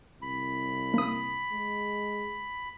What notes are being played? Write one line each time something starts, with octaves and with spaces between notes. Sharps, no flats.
C2 B5
A#3 D#6
G#3